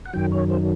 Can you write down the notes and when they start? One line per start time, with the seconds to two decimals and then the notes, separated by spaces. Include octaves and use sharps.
0.06 F#5
0.13 F#2 D#3 F#3 G5
0.32 C#5
0.50 C5